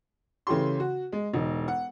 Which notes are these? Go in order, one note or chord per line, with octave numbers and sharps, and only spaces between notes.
C#3 E3 A3 G4 C6
F#4
G#3
E1 D#4
F#5